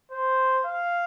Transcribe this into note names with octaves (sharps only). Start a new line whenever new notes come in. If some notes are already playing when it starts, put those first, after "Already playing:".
C5
F5